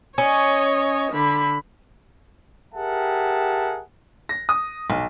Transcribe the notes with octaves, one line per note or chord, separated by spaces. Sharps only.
C#4 C#5 D#5
D3 B5
G4 G#4 A#4 E5 F#5 A5
A#6
D#6
B1